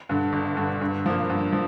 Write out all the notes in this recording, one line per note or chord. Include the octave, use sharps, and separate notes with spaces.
G2 D3
G1
G2 D3
G2
F3 A#3
G2
F3